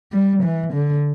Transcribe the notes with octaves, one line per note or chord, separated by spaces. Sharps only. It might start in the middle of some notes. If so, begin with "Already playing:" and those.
G3
E3
D3